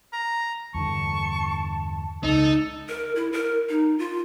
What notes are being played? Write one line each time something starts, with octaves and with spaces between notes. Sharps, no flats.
A#5
E2 G2 D3 A5 C#6
C#2 D#4 A4
A#4
E4
A#4
D#4
F4